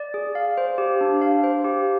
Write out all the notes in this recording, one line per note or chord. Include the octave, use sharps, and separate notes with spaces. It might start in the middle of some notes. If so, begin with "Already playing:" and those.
Already playing: D5
G#4
F5
C5
G4
D4
F5
C5
G4